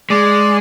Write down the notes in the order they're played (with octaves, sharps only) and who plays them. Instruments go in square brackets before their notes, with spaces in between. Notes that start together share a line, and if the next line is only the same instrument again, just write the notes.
[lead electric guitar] G#3 [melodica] D5